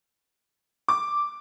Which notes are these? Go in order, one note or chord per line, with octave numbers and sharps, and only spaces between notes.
D6